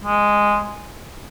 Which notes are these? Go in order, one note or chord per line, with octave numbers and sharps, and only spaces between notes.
G#3